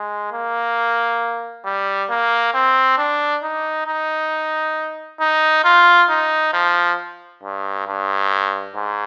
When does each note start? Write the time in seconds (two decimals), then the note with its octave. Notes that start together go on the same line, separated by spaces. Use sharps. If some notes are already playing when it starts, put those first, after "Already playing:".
Already playing: G#3
0.32 A#3
1.65 G3
2.10 A#3
2.54 C4
2.98 D4
3.43 D#4
3.87 D#4
5.20 D#4
5.64 F4
6.10 D#4
6.53 F3
7.43 G2
7.87 G2
8.75 G#2